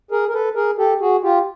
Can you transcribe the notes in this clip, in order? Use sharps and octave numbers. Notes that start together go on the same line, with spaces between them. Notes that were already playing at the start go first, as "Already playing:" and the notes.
G#4 A#4
A#4
A4 B4
G#4 A#4
G4 A4
F#4 G#4
F4 G4